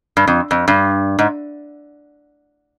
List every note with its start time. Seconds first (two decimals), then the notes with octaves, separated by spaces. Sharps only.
0.17 G2
0.28 F2
0.51 F2
0.68 G2
1.19 G#2